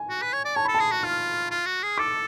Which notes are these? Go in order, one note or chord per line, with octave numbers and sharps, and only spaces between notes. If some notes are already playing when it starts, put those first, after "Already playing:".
Already playing: G#5
F#4
B4
C#5
D5
C#5 A5
A4 B5
A5
G#4
F#4
F4 F6
F4
F#4
G#4
A4 D6